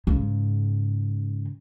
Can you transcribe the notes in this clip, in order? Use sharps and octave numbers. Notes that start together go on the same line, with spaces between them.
G#2 C#3